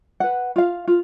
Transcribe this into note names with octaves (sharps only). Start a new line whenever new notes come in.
B4 F#5
F4 F5
F4